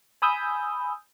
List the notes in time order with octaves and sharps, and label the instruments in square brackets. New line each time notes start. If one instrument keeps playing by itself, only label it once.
[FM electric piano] G#5 B5 D#6 E6 G6